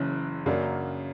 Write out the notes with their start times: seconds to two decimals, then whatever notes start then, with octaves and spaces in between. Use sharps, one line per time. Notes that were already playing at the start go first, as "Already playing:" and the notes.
Already playing: F#1 F#2 C#3 E3
0.46 F#2 C#3 F#3 A#3 D4